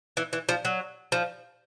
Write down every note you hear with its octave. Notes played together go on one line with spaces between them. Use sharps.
E3
E3
F3
F#3
F3